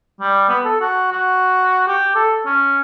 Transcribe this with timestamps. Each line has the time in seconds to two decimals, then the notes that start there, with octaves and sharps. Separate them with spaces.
0.21 G3
0.49 B3
0.65 A4
0.81 F#4
1.12 F#4
1.88 G4
2.15 A4
2.46 C#4